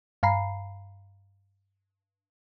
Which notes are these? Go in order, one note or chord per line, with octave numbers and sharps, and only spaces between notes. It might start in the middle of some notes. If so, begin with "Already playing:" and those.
G2 F5 G#5 A#5 B5 C7